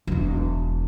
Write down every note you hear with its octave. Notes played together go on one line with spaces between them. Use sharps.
E1 E3